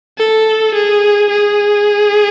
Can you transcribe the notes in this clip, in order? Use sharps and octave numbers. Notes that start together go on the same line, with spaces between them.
A4
G#4
G#4